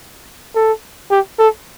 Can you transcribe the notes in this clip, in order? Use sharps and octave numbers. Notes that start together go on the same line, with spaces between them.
A4
G4
A4